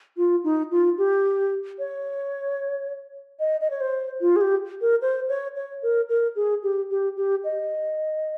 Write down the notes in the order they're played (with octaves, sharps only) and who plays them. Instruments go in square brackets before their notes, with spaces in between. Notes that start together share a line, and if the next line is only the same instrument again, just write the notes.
[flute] F4
D#4
F4
G4
C#5
D#5
D#5
C#5
C5
F4
G#4
G4
A#4
C5
C#5
C#5
A#4
A#4
G#4
G4
G4
G4
D#5